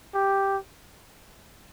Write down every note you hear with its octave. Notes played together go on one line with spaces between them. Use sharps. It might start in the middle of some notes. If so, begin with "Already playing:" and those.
G4